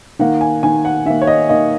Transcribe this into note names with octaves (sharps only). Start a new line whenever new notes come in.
D#3 A#3 F#5
G#5
D#3 A#3 G#5
F#5
D#3 A#3 E5
C#5
D#5
D#3 A#3 D#5